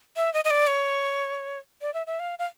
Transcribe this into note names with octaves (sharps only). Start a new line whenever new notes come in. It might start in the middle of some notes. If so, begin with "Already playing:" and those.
E5
D#5
D#5
D5
C#5
D5
E5
E5
F5
F5